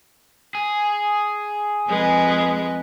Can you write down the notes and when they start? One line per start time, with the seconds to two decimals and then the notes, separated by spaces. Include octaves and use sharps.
0.55 G#4
1.88 F2 G#3 B4